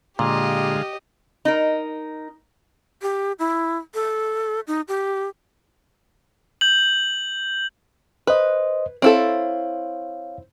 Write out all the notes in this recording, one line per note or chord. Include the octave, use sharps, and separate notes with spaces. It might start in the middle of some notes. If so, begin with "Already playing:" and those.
A#2 D3 G#3 G4 D#5 F5
D#4 A#4
G4
E4
A4
D#4
G4
G6 F#7
B4 C5 D#5
C4 E4 A4 C#5 F5